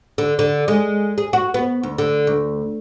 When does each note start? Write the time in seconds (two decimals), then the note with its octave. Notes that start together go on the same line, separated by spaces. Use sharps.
0.18 D3
0.39 D3
0.68 G#3
1.18 G#4
1.33 F#4
1.54 B3
1.83 D2
1.98 D3
2.27 D2